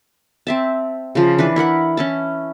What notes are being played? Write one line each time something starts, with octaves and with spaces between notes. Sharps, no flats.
C4 E5 A5
C#3 F3
E3 D4 B4
E4 A#4 F#5 B5
C#4 E4 A5